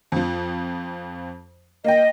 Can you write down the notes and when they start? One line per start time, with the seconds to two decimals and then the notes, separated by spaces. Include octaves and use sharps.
0.12 F2 F3
1.84 A#3 D#5 G5